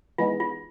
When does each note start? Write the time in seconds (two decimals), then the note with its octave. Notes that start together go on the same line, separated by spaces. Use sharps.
0.18 E3 G#3 B3 D#4 F4
0.40 F4